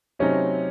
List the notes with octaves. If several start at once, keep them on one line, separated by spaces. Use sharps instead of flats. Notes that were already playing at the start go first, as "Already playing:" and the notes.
C3 F#3 A3 C4 C#4 D#4